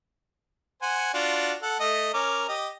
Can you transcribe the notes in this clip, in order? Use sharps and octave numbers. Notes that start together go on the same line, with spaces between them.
C5 F#5 G#5
D4 F4 F#4
A4 F#5
A3 D#5
C#4 A#4 D6
G4 D#5